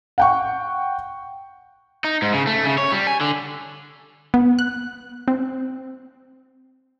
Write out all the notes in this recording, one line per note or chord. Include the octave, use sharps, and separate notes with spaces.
F#5 G5 C#6
D#4
G#2
C#3
A3
C#3
C#5
G3
G#5
D3
B3
F#6
C4